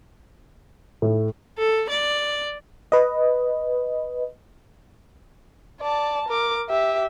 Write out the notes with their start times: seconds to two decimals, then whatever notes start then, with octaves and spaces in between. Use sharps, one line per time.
1.02 A2
1.58 A4
1.89 D5
2.92 B4 D#5
5.81 D5 A5
6.28 A#4 D6
6.70 G4 E5